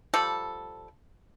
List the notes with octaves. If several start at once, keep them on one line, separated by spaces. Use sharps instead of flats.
F3 G3 A4